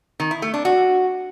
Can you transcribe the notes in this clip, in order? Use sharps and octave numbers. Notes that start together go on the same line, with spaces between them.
D#3
E4
A3
D4
F#4